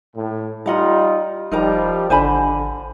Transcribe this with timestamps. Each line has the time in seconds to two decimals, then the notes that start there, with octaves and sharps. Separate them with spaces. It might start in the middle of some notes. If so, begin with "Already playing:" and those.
0.15 A2
0.66 G3 D#4 F4 D#5 F#5 A#5
1.51 E1 F3 G3 D#4 A#4 A#5
2.10 G#1 D3 C5 G#5 B5